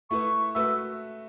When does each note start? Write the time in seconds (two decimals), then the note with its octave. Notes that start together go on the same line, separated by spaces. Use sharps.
0.10 A3 E4 B4 C#6
0.55 A3 F#4 B4 E5 E6